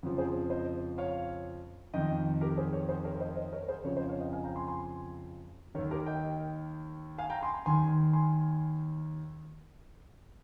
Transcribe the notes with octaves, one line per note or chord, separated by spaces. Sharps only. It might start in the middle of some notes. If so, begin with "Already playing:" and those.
F2 C#3 F3
G#4 C5
C5 D#5
C#5 F5
F2 D#3 D#5 G5
G4 A#4
G#4 C5
A#4 C#5
G#4 C5
A#4 C#5
C5 D#5
C5 D#5
A#4 C#5
G#4 C5
F2 C#3 F3 A#4 C#5
C5 D#5
C#5 F5
D#5 G5
F5 G#5
G5 A#5
G#5 C6
G#5 C6
D#2 D#3 A#4 C#5
G4 A#4
D#5 G5
F5 G#5
G5 A#5
G#5 C6
D#2 D#3 G#5 C6
G#5 C6